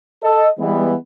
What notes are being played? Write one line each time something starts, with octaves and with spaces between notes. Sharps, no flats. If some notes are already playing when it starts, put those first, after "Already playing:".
A4 D#5
E3 G3 G#3 B3